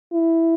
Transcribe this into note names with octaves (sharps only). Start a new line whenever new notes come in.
E4